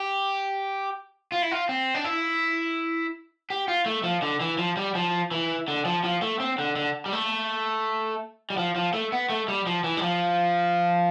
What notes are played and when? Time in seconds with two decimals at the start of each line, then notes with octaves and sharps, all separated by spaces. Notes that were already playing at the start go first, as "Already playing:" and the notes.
Already playing: G4
1.32 F4
1.42 E4
1.51 F4
1.69 C4
1.95 D4
2.04 E4
3.50 G4
3.68 F4
3.86 A3
4.04 F3
4.22 D3
4.40 E3
4.58 F3
4.77 G3
4.95 F3
5.31 E3
5.68 D3
5.85 F3
6.04 F3
6.22 A3
6.40 C4
6.59 D3
6.76 D3
7.06 G3
7.13 A3
8.50 G3
8.57 F3
8.76 F3
8.93 A3
9.12 B3
9.30 A3
9.48 G3
9.67 F3
9.84 E3
9.97 G3
10.02 F3